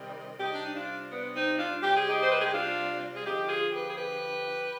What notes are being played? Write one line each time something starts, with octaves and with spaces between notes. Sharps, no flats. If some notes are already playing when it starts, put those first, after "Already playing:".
Already playing: C3 D#3 G3
C3 G3 D#4 G4
D4
D#4
D4 F4
B3 D4
C4 D#4
D4 F4
C3 G3 G4
G#4
D#4 G4
C5
B4
G#4
G4
D4 F4
G#4
D3 F3 D#4 G4
F4 G#4
G4 B4
G#4
G4 B4